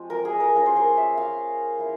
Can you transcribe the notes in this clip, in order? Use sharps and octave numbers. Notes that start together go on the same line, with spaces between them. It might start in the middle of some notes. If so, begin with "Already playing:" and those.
Already playing: F3 G#3 C4
A#4
G#4
A#4
A#3 C#4 F4 A#4
C5
A#4
E5
F5
A#3 E4